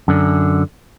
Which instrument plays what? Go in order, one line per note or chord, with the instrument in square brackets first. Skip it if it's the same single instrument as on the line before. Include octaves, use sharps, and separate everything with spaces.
[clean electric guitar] F#2 D3